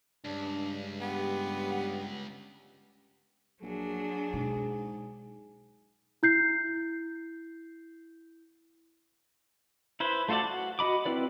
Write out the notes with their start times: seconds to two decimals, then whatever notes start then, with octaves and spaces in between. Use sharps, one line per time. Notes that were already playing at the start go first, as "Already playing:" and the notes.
0.25 C#2 G2 D4
1.01 B3 G4
3.62 A#1 F#3 D4 G#4
4.33 G#2 B2
6.23 E4 G6 C7
10.00 E4 B4 C5
10.28 A3 F4 F#4 A4 D5
10.43 F#4
10.79 F#4 D#5 B5 D6
11.05 C4 E4 B4 D5